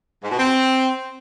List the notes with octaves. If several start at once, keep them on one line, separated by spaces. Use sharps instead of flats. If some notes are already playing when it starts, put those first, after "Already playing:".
G#2
B2
C4